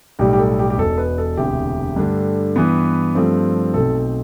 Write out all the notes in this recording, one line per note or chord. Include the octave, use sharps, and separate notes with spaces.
B1 A2 G3 G4
G4
A4
G4
G4
E1 E2 B2 A4
B4
A4
E1 D2 C3 G4
G2 D3 A3
G2 E3 B3
G2 F3 A3 C4
B1 B2 A3 C4 A4